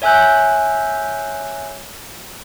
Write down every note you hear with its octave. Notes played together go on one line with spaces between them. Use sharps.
C#5 E5 G#5 E6 F#6 G6